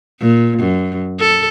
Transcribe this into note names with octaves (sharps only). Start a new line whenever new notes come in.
A#2
F#2
A4